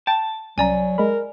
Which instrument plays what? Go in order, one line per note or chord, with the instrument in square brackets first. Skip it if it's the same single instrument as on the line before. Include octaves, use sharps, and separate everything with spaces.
[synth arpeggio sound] G5 [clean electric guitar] A5 [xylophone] A6
[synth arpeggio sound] C2 C#4 A#5 [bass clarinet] F#3 [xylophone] D5 G#5
[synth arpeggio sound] G#3 B5 [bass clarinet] A#4